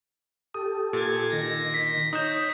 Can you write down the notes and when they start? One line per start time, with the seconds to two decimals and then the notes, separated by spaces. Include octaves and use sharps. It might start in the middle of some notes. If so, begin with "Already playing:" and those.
0.54 G4 A4 D#6
0.93 A#2 G#6 A6
1.33 D#3 A#6
1.74 B6
2.13 D#4 C#5 D#6 F#6 G6 E7